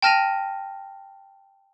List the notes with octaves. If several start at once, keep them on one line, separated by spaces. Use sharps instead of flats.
G5 A5 F6 A#6 D#7 F7